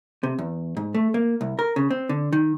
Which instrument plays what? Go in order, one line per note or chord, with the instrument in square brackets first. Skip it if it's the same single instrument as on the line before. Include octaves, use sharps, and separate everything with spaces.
[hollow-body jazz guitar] C3
E2
G#2
A3
A#3
C2
A#4
C#3
C4
D3
D#3